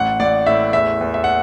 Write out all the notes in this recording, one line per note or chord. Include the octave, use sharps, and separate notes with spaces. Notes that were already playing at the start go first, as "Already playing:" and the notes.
Already playing: A1 F#5
A1 D5
A2 E5
E2 E5
E2
E5
F#5